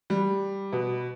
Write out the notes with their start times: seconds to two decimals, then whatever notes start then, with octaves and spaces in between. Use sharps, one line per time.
0.10 G3
0.72 B2